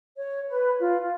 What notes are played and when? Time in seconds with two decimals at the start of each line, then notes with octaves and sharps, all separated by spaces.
0.17 C#5
0.49 B4
0.79 F4
1.01 F4